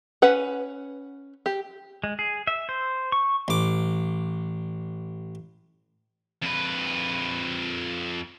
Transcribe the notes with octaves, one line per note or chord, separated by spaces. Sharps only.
C#4 B4 F#5
G4
G#3
G#4
E5
C5
C#6
A1 D6
F2 B4